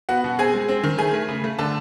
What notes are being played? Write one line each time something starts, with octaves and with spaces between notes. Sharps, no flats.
B3 F#4 F#5
B2
C4 G#4 G#5
G#3
C4
D#3
A3 G#4 G#5
A3
C#3
A3
D3 A4 A5